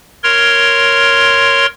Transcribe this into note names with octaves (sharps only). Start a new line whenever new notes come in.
A#4 C#5 C6